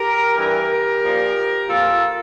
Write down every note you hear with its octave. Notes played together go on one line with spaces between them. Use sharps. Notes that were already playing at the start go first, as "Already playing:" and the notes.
Already playing: G4 A#4
G2 E3 G4 A#4
A#2 F3
A#2 F3 F4 A4